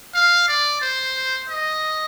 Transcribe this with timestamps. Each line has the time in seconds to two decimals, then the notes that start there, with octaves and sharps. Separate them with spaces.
0.14 F5
0.48 D5
0.82 C5
1.49 D#5